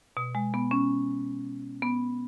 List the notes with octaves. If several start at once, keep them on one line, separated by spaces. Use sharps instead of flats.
B2
G#3
B3
C#4
B3